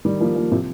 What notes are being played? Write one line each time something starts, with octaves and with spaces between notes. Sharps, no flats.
D#3 G3
F3 A#3
F3 A#3
C3 F3